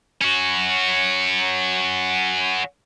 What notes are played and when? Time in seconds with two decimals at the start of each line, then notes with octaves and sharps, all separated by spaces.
0.21 C#4 F#4